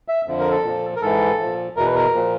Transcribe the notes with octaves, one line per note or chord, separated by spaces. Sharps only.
E5
F2 D3 F3
A#4
A4
A#2 F3
A#4
G#2 E3 A4
A#2 F3
E2 B2 A#4
B4
A#4
A#2 F3